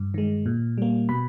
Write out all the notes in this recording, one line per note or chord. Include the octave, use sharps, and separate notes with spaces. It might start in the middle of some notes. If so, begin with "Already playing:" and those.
Already playing: G2
D#3 G#3
A#2
G3 A#3
B2 B5